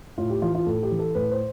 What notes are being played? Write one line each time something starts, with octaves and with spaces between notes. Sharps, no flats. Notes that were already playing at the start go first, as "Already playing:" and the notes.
A2 F4
G4
E3 F4
F4
A2 A4
G4
E3
A4
A2 B4
C5